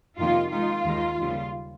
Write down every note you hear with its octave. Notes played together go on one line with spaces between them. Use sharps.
F2 C3 D#3 A#3 D#4 F4
D#3 G#3 D#4 F4
D#2 D#3 G#3 D#4
D#2 C#3 G3